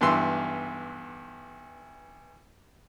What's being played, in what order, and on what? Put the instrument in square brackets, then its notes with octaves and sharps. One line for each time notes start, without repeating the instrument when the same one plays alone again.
[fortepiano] B1 G2 E3 C6 E6